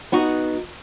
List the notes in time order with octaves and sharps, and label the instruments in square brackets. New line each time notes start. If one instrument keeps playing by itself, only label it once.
[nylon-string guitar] B3 D#4 F#4